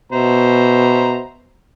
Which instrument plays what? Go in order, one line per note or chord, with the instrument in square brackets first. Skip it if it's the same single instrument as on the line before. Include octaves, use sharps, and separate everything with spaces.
[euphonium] B2 [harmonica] C5 E5 A#5